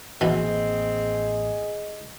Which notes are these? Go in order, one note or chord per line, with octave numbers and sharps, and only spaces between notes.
A1 B2 D#3 E3 A#3 C4 G#4 D#5